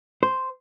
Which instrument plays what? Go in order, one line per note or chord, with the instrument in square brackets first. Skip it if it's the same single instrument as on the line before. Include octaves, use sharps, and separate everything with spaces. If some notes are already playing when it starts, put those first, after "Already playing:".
[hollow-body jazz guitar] C5